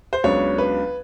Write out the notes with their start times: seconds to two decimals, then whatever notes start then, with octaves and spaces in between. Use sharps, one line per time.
0.13 C5
0.24 C#2 C#3 F#3 B3 D4 C#5
0.58 B4